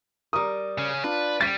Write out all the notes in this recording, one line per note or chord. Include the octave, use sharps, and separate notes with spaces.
G3 A#4 D#6
C#3 C#4
D4 F4 B4
G3 A6 B6 D#7